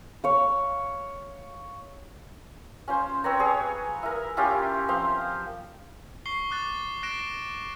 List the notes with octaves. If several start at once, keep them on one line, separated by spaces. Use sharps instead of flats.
C#5 F5
C#4 F4 C5
C4 B4 C#5 A#5
G#4 C#5
E4 A#4
C#4 E4 F4 G4
F3 C4 C5 F5
C#6 C7 G7
D6 F#6 A6
F#6 A#6 D7 E7